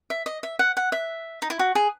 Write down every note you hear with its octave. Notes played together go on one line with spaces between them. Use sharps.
E5
D#5
E5
F#5
F#5
E5
D#4
E4
F#4
G#4